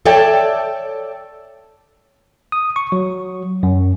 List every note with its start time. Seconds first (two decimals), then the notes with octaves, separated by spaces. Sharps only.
0.05 A4 C#5 D5 E5 G5 A5
2.52 D#6
2.76 C#6
2.92 F#3
3.63 F#2